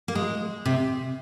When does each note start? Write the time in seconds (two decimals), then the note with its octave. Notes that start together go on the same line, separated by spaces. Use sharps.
0.08 A#3
0.15 G#3
0.65 C3